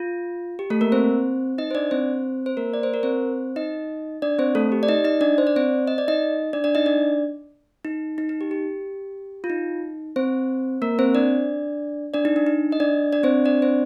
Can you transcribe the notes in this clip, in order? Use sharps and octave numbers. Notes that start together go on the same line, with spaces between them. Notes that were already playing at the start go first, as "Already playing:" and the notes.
Already playing: F4
G4
A3 A4
A#3 A#4
C4 C5
D#4 D#5
C5
D4 D5
C4 C5
C5
A#3 A#4
D5
C5
A#4
C4 C5
D#4 D#5
D4 D5
C4 C5
A3 A4
G4
D5
D#4 D#5
D#4 D#5
D4 D5
C5
D5
C4 C5
D#5
D5
D#4 D#5
D4 D5
D4 D5
D#4 D#5
D4 D5
D#4
D#4
D#4
G4
G4
F4
D#4
C4 C5
A#3 A#4
C4 C5
D4 D5
D4 D5
D#4
D4
D#4
D#5
D4 D5
D4 D5
C4 C5
D4 D5
C4 C5